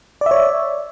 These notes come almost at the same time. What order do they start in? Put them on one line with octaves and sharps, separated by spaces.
D5 E5 C#5